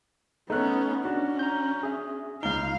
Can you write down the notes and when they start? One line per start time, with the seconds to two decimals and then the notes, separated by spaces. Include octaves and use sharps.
0.50 A3 B3 C#4 D#4 C#5 F#6
1.05 C#4 D4 F#4
1.39 A#5 G6
1.83 G#4 E5
2.43 C#2 D#4 F5 G7